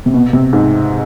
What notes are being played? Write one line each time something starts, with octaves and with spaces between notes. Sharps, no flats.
C3
B2
C3
G#2